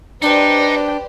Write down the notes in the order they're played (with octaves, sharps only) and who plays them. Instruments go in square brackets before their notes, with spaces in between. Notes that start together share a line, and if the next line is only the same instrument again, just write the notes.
[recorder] D4 [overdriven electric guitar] D#4 [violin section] G4 C5 D5 [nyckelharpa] B4 G5